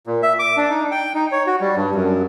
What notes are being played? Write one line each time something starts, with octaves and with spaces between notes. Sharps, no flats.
A#2
E5
D6
D4
D#4
G5
D#4
C#5
F#4
G3
G2
F#2